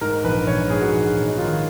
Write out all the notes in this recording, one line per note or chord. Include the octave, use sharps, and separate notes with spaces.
G#2 A#4
A#1 B4
A#1 C#5
C#5
G#2 G#4
F#4
A#1
A#1
D#4
D#3 F4